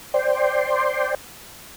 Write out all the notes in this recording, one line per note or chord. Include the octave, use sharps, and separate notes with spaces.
C5 D5 G5 C6